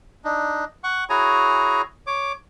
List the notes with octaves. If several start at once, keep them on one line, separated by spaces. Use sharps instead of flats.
D4 D#4
F#5 C#6
E4 F#4 G#4 C#5 G#5 A#5
C#5 D6